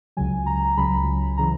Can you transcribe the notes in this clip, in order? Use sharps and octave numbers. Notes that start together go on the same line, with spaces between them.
C#2 C#3 F#3 G#5
A#5
C#2 C#3 F#3 B5
C#3 E3 A#5